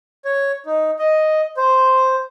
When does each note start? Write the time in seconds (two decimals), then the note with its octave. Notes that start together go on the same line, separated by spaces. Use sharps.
0.25 C#5
0.66 D#4
0.99 D#5
1.57 C5